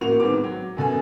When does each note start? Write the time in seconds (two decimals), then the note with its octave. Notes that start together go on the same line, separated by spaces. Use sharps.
0.01 A1 A#3 F#4 F7
0.20 G#1 G#2 B3 C4 D6
0.44 F#3
0.77 F#2 B2 A4 G#5